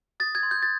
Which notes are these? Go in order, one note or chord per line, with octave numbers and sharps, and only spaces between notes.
D#6 A6
G#6
C6
G6
A6